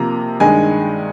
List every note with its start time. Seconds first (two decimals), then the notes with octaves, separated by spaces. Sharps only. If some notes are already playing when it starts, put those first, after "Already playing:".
Already playing: C3 F3 A#3 A#5
0.40 G2 D#3 G#3 G#5